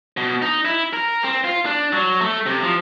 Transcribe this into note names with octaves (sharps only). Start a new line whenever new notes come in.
B2
D#4
E4
A#4
C4
F4
D4
F#3
A3
C3
F3